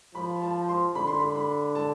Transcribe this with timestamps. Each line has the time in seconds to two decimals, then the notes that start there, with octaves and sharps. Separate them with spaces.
0.15 F3 B5
0.42 A5
0.69 C6
0.95 D3 B5
1.07 C6
1.19 B5
1.35 B5
1.75 A5